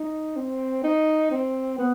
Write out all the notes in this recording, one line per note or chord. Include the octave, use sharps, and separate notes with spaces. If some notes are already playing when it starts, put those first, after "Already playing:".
Already playing: D#4
C4
D#4
C4
B3